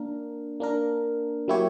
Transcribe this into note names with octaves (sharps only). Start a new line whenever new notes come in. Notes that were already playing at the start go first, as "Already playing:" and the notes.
Already playing: A#3 D4 A#4
A#3 D4 A#4
F#3 A#3 E4 G4 C#5